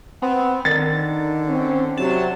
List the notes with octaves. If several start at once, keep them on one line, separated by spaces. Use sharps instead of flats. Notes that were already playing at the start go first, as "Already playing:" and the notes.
B3 C4
D3 D#3 A6
C4 C#4
C3 F#3 A5